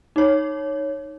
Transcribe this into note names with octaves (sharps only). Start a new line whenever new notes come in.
D#4 C#5